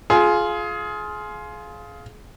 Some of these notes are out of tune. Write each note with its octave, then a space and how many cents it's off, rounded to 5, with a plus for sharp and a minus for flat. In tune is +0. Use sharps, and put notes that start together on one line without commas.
F4 +0 G#4 +25